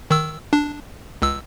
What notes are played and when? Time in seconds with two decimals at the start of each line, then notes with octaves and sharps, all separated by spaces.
0.10 D#3 E6
0.53 D4
1.22 C#2 E6